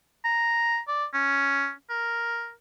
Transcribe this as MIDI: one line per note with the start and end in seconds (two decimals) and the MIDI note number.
0.25 0.79 82
0.88 1.05 74
1.14 1.71 61
1.90 2.51 70